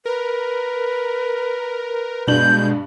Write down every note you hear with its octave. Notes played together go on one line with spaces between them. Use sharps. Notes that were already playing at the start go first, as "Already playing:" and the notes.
A#4 B4
G2 B2 G#3 D4 G6 F#7